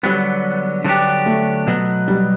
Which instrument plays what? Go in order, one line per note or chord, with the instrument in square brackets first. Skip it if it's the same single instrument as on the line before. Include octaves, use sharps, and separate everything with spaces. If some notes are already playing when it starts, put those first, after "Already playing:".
[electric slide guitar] D3 F#3 B3 [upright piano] G3
[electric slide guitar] D3 F#3 B3 D4 G4
[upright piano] A3
[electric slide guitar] B2 F#3 B3
[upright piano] G3